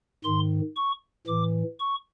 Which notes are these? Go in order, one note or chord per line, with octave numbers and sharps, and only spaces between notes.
G#2 D#3 C6
C#6
A2 E3 D6
C#6